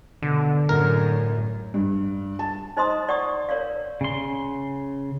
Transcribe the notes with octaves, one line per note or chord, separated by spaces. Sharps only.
B2 D3
F#2 A2 A#4
G2
A5
D#4 C5 D#5 A#5 C6 D#6
D5 F#5 C#6 D#6
A#4 C#5 D5 F5
C#3 C6